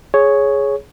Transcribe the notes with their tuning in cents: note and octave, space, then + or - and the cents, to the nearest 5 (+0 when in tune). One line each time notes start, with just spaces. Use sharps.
G#4 +5 C#5 +0